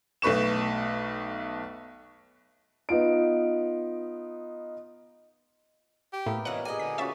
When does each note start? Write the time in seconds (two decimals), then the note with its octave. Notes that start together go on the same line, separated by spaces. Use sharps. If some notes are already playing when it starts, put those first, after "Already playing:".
0.22 B1 A3 B4 C#6 E7
2.89 B3 D#4 F4 D7
6.13 G4
6.26 A2 A#3 B3 A#4
6.45 A#2 E3 C#4 D#5 F#5
6.65 G4 G#4 D#5 G#5
6.79 D3 B6
6.98 C#4 F4 F#4 E5 A6 B6